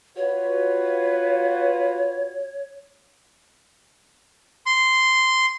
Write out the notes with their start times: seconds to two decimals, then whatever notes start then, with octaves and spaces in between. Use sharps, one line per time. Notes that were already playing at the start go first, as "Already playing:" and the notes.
0.17 F4 F#4 B4 C#5
4.66 C6